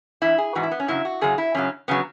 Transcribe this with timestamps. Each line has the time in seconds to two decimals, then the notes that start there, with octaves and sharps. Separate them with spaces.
0.22 G#2 E3 E4
0.38 G#4
0.55 G#2 E3 F#4
0.63 E4
0.71 B3
0.80 C#4
0.88 F#2 C#3 F#3 E4
1.05 F#4
1.21 F#2 C#3 F#3 G#4
1.38 E4
1.55 F#2 C#3 F#3 C#4
1.88 C#3 F#3 B3